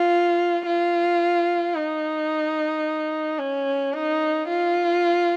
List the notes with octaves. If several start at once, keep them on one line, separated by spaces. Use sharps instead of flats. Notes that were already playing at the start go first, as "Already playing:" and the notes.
Already playing: F4
F4
D#4
C#4
D#4
F4